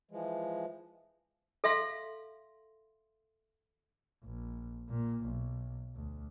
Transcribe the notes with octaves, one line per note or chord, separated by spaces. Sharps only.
E3 F3 G#3
A4 E5 F5 C6
A#1
A#2
B1
D2